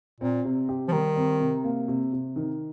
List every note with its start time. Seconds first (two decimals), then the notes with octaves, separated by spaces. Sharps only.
0.21 A#2 C4
0.45 C3
0.69 G4
0.88 F3
0.92 D#3 G3
1.16 C4
1.40 C3
1.64 A#3
1.88 C3
2.13 C3
2.36 D#3